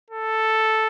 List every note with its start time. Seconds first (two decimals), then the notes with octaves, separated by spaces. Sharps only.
0.11 A4